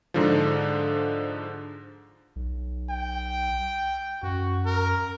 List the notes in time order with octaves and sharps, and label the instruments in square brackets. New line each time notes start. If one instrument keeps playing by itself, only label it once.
[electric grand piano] G#2 D3 F3
[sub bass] B1
[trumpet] G5
[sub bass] F#2 [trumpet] F#4
[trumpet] A#4